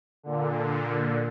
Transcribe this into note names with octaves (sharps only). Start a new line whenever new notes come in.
A#2 D3